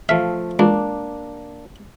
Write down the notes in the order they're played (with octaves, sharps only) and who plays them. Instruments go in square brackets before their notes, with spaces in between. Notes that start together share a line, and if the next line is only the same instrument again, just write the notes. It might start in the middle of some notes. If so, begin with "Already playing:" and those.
[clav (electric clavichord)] F3 A3 F5 [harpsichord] E5
[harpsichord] C#2 [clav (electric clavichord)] A#3 D4